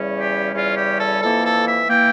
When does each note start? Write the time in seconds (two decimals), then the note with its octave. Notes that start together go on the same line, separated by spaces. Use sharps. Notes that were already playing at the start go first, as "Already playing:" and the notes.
Already playing: E2 C#3 G3 C#4
0.20 G4
0.53 E2 C#3 G3 C#4 F4
0.75 G4
0.98 A4
1.21 F2 E3 A#3 E4 A4
1.44 A4
1.66 E5
1.88 E3 A#3 E4 G5